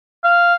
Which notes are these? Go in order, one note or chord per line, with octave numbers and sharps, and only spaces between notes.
F5